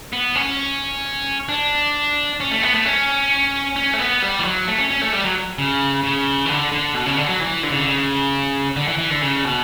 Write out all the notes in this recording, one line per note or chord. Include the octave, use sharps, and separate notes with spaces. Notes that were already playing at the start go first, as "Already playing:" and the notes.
B3
C#4
D4
C#4
A3
B3
A3
C#4
C#4
A3
B3
G3
E3
F#3
A3
C#4
C#4
A3
G3
F#3
C#3
C#3
E3
D3
D3
B2
C#3
D3
F#3
E3
D3
C#3
D3
C#3
D3
E3
E3
D3
C#3
B2